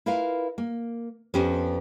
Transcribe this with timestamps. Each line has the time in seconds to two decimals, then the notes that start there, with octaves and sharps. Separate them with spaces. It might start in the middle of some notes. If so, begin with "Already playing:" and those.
0.06 E4 F4 A#4 B4 F5
0.58 A#3
1.34 F2 F3 B3 C#4 G4